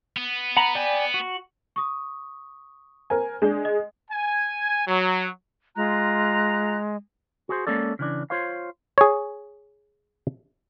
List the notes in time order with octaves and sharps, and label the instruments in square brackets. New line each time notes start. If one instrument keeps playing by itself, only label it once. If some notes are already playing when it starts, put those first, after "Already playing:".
[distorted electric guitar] B3
[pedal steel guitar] F#5 A#5 B5
D5 G5 G#5
F#4
[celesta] C#6 D#6
[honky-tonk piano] A#4 C5 G#5
[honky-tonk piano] G#3 [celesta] D4 D5
[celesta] D#5
[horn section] G#5
F#3
[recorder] G#3 [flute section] F4 A#5 F#6
[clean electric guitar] F#4 G#4 C5
G#3 A#3 C#4 A4 D5
C#3 E3 D4
F4 C5 C#5 F5
[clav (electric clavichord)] G#4 C#5